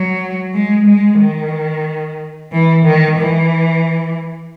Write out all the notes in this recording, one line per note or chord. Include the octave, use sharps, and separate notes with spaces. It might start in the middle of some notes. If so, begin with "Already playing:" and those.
Already playing: F#3
G#3
G#3
D#3
E3
D#3
E3